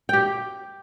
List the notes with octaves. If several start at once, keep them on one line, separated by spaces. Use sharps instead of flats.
G4 G5